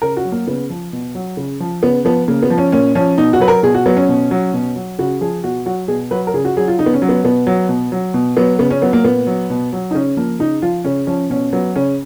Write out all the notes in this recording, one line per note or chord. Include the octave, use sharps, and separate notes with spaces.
C#3 A#4
F#4
F#3
A#3
C#3 B3
F3
B2
F#3
C#3
F3
C#3 B3
F3 B3
C#3 A#3
B3
F3
C#4
A#2 C#4
F3 C#4
B2 D#4
F#4
F#3 B4
A#4
B2 G#4
F#4
F#3 B3
C#4
B2
F#3
B2
F#3
C#3 F#4
F3 G#4
B2 F#4
F#3 F#4
B2 G#4
F#3 B4
A#4
C#3 G#4
F#4
F#3 G#4
F4
C#3 D#4
B3
C#4
F#3
B3
B2 B3
F#3
B2
F#3
B2
F#3 B3
C#3 B3
C#4
F#3 B3
A#3
A#2 B3
F#3
B2
F#3
D#4
C#3 C#4
F3 A#3
C#3 D#4
F3 F4
C#3 C#4
F3 C#4
B2 C#4
F#3 B3
C#3 C#4